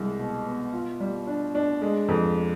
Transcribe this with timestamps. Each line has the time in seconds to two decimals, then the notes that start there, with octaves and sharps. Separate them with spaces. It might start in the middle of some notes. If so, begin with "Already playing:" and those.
Already playing: C2 G#3
0.19 B2
0.46 B3
0.73 F4
1.00 G3
1.27 D4
1.55 D4
1.82 G#3
2.09 F2